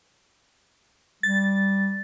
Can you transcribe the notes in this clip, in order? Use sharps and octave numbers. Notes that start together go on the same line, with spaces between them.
G3 A6